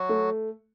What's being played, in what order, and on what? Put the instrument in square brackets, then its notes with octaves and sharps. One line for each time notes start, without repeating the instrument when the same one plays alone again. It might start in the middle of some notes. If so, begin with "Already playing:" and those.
Already playing: [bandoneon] F#3 F#4
[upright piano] A3